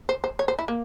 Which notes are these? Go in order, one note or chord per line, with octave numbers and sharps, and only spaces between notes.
C5
C5
C#5
C5
E4
A#3